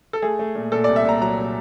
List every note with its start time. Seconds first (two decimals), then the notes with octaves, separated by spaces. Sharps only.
0.13 A4
0.22 A3 G#4
0.39 A3
0.55 A#2
0.72 A#2 A4
0.84 C2 D5
0.96 E5
1.05 A#2 A#5
1.21 F#3 A#5
1.38 A#2